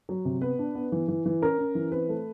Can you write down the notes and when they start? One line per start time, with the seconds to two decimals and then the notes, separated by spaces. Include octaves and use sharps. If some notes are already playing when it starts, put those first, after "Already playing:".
0.09 F#3
0.25 C3
0.42 B3 B4
0.59 D4
0.75 B3
0.92 E3
1.08 E3
1.26 E3
1.42 C#4 A#4
1.58 C#4
1.75 E3
1.92 C4 B4
2.09 A3